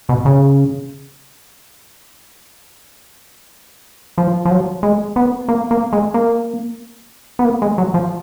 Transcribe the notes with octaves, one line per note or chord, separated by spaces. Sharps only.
B2
C#3
F3
F3
F#3
G#3
B3
A#3
A#3
G#3
A#3
B3
A#3
G#3
F#3
F3